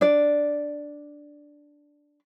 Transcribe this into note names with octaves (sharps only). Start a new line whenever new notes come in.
D4 D5